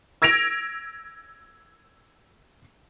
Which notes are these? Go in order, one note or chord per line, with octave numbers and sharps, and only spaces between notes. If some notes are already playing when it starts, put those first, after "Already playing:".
E6 G#6 A#6 D7 F7